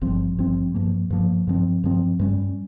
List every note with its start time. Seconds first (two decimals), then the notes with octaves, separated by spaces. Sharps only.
0.01 G#1 G2 F3 C4
0.38 G#1 G2 F3 C4
0.74 G2 F3 A#3
1.10 G2 F3 A#3
1.47 G2 F3 C4
1.84 G2 F3 C4
2.19 G2 G3 C#4